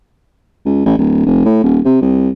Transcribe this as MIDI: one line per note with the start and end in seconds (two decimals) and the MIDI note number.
0.66 0.82 37
0.86 0.94 33
0.98 1.22 26
1.26 1.43 29
1.46 1.60 45
1.64 1.79 27
1.85 1.99 48
2.01 2.29 36